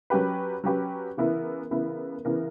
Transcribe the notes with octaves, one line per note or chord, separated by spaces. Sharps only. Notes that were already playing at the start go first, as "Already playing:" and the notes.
F#3 C#4 G4 B4
F#3 C#4 G4 B4
C#3 E3 B3 E4 A#4
C#3 E3 B3 E4 A#4
C#3 E3 B3 E4 A#4